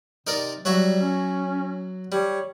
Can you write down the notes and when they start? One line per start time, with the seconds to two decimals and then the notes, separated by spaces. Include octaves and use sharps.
0.27 C3 D#4 A#4 D5
0.65 F#3 G3 F#4 E5
1.01 C#4
2.12 G3 C#5